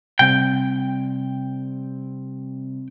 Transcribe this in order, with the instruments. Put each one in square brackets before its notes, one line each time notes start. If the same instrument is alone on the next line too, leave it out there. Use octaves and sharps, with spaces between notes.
[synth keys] C3 G3 C4 [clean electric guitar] G5